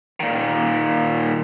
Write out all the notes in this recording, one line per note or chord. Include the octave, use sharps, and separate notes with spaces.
A#2 D#3